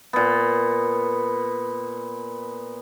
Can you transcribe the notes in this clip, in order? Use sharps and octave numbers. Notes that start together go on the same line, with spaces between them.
A#2 B3